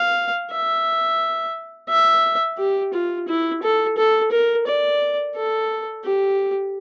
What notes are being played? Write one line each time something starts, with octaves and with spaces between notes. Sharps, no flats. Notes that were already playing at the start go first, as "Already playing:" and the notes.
Already playing: F5
E5
E5
G4
F4
E4
A4
A4
A#4
D5
A4
G4